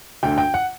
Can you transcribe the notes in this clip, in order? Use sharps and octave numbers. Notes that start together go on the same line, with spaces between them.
D2 D3 G5
G5
F#5